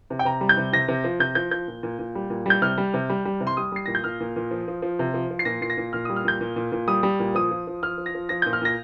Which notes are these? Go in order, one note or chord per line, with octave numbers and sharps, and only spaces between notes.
C3
G5
C3 A#5
G3
G6
C3
C3 A#6
C3
F3
C3 G6
F3 G6
F3 G6
A#2
A#2
A#2
G3
A#2
G3 G6
C3 F6
G3
C3
G3
G3
C3
C6
G3 D#6
G3 C7
A#2 A#6
G6
A#2 F6
A#2
A#2
F3
F3
F3
C3
F3
F3
C7
A#2 A#6
A#2 C7
A#6
A#2
A#2 F6
G3 D#6
F6
A#2 G6
A#2
A#2
A#2
G3 D#6
G3
A#2
F3 D#6
F3
F3
F3 F6
F3
A#6
F3
F3 A#6
A#2 G6
F6
A#2 A#6